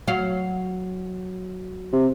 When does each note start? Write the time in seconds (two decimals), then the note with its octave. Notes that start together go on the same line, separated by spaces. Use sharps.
0.08 F#3 F5
1.93 C3